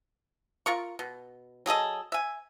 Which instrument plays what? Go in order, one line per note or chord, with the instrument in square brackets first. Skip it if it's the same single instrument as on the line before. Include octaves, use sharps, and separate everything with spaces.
[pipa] F4 A#4 C#6
B2
F#3 G#4 A4 D#5
E5 G#5